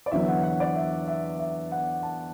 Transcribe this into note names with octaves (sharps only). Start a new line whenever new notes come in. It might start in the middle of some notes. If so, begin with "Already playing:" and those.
D5
E2 D3 F#3 E5
F#5
F#5
D5
E5
E5
E5
F#5
A5